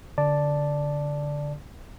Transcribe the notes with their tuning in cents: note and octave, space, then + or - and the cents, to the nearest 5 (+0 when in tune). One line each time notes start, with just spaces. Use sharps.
D3 -20 D5 +0 A5 +0